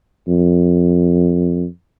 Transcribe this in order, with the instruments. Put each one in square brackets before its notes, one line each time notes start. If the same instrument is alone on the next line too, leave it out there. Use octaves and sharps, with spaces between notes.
[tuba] F2